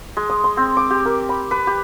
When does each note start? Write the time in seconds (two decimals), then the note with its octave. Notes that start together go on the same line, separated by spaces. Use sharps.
0.17 G#3
0.29 D#6
0.44 C6
0.57 C4
0.77 D6
0.90 G4
1.05 A#4
1.29 B5
1.51 B4
1.67 G4